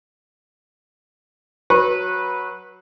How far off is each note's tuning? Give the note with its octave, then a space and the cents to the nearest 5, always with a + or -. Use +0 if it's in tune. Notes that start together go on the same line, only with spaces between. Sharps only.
F#3 +0 B4 -15 C#6 -30